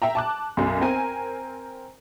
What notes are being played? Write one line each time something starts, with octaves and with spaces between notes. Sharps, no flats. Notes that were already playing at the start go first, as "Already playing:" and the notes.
E5 G5 A#5
A5 D6 F#6
B1 F#2
C4 A#4 G#5